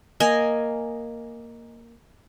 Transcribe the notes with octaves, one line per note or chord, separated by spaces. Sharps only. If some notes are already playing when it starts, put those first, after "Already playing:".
A#3 D#5 G#5